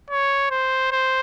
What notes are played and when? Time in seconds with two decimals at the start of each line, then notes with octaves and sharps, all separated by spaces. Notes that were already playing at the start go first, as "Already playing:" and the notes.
0.10 C#5
0.51 C5
0.91 C5